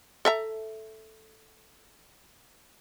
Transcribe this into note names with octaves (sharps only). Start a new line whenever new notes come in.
A4 E5 A#5